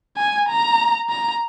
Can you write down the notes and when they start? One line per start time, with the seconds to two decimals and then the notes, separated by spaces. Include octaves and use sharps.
0.17 G#5
0.49 A#5
1.10 A#5